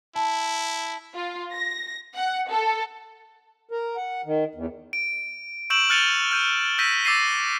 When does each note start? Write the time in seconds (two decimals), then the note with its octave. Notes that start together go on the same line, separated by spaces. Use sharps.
0.15 E4 A5
1.14 F4
1.53 A#6
2.15 F#5
2.50 A4
3.71 A#4
3.97 F#5
4.26 D#3
4.55 E2
4.93 D7
5.70 C#6 E6 G6 D7 E7 F#7
5.90 F6 F#6 A6 C#7 D#7 F7
6.31 F6 G6 D#7
6.78 E6 G6 A#6 B6 D#7
7.05 D6 E6 A6 A#6 C7 D#7